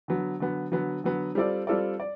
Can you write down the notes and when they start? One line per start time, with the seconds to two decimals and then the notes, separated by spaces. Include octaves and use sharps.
0.08 D3 F#3 B3
0.40 D3 F#3 B3
0.72 D3 F#3 B3
1.04 D3 F#3 B3
1.35 G3 C4 F4 A4 D5
1.67 G3 C4 F4 A4 D5
2.00 D5